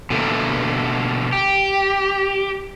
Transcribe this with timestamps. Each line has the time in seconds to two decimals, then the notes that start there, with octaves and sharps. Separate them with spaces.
0.10 B2 D3 A3 A#3
1.33 G4